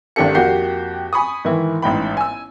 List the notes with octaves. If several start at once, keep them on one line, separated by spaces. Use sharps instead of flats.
G#1 D#3 D4 G4 A4 C#7
F2 A#3 F#4 G4 G6 C7
G#5 B5 C#6 D#6
G#2 D#3 E3 E4
A1 G#2 G5 B5
G#5 E6